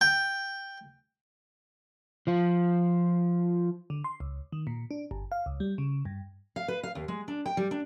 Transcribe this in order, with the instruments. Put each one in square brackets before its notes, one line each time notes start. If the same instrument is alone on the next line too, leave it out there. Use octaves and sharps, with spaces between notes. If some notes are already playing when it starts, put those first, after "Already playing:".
[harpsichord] G5
[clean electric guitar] F3 F4
[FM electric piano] D3
C6
C#2
D#3
A#2
D4
G1
F5
C#2
G3
C#3
G2
[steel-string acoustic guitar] F5
B4
F5
D#2
G#3
D4
G5
G3
D4